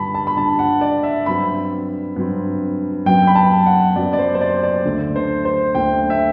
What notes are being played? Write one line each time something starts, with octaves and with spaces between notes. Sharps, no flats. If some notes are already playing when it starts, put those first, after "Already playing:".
Already playing: G2 D3 G3 A5 B5
A5
B5
G2 D3 G3 A5
F#5
D5
E5
G2 F#3 C4 B5
G2 F#3 C4
F#2 F#3 B3 G5
B5
A5
F#5
F#2 F#3 B3 D5
D5
C5
C5
D5
D5
D2 D3 A3
C5
C5
D2 D3 A3 G5
E5